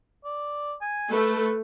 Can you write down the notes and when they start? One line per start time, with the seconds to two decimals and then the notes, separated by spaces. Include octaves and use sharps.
0.24 D5
0.82 G#5
1.12 A3 B4